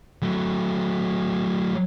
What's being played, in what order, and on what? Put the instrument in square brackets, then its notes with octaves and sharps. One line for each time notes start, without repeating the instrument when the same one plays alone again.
[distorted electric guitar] F#3 A3